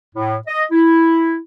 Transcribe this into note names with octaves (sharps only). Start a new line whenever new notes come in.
A2
D#5
E4